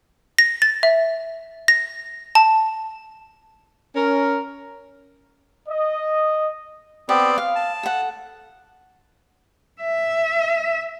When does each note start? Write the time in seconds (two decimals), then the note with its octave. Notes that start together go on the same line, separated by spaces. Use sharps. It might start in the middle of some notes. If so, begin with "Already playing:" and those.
0.39 A#6
0.62 A6
0.83 E5
1.68 A#6
2.35 A5
3.95 C#4 A#4
5.69 D#5
7.09 B3 C4 G4 D5
7.38 F5
7.55 A5
7.83 A4 F#5
9.82 E5